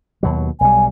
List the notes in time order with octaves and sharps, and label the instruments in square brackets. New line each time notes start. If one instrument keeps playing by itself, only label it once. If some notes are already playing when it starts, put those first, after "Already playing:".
[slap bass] D#2 B2 F#3
[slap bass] B1 G3 [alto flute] G#5